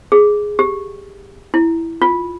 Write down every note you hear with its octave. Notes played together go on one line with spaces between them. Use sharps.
G#4
G4
E4
F4